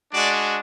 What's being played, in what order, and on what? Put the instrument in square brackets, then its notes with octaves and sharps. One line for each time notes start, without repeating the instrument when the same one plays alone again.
[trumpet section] G#3 D4 F#4 D5